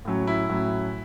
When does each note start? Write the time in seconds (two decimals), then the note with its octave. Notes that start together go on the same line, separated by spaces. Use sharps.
0.05 A2 F#3 C#4
0.27 E4
0.49 A2 F#3 C#4